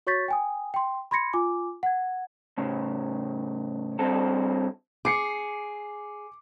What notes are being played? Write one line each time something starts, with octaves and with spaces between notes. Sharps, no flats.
F#4 C#5 C#6 G6 A6 B6
G5 G#5 D#6
G5 C6
B5 C6 G#6 A#6 C#7
F4 G#5 D6
F#5 G#6
A2 C#3
G2 C4 A4
G#4 D6 C7 C#7